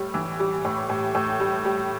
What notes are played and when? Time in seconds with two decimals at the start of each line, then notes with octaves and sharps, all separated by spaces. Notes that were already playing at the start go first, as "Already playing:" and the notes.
Already playing: A2 G3
0.14 E3
0.40 G3
0.65 A2
0.89 A2
1.15 A2
1.40 G3
1.65 G3